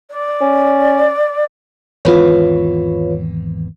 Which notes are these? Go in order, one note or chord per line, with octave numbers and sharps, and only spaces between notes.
D5
C#4
G#1 E2 E3 F4 B4 C#5